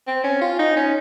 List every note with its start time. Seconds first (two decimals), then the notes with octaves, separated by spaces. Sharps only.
0.07 C4
0.24 C#4
0.42 F4
0.59 D#4
0.77 C#4